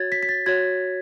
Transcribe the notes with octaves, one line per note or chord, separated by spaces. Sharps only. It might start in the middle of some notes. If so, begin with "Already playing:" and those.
Already playing: F#4 C#5 G#6 A6
B6
B6
A6
F#4 C#5 G#6